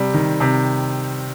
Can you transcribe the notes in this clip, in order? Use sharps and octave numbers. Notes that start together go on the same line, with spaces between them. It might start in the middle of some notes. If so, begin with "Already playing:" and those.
Already playing: C3 G3
D#3
C3